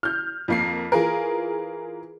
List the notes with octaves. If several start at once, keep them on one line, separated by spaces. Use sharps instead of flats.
F6 G6
F2 A#3 C7
E3 F4 G#4 A#4